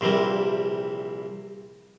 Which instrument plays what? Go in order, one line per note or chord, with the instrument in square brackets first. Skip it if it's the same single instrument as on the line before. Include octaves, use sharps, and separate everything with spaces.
[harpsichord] A#1 C3 E3 G3 A#3